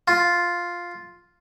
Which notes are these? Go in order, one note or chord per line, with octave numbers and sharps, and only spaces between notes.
F4